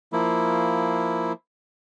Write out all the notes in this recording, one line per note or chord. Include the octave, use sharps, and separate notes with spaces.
F3 A#3 E4